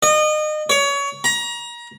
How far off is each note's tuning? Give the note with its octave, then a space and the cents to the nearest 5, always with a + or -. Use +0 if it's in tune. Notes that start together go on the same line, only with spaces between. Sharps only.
D#5 -30
C#5 +25
A#5 +30